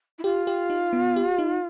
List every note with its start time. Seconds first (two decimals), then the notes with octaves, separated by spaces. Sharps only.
0.18 E4
0.23 F4 G4
0.47 G4
0.70 D#4
0.93 B3
1.16 G4
1.38 D#4